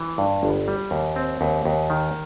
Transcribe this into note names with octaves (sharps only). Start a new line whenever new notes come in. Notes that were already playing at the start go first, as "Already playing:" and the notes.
Already playing: E3
G2
G1
G3
D#2
C4
D#2
D#2
D#3